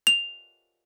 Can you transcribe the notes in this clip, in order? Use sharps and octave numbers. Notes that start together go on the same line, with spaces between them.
F7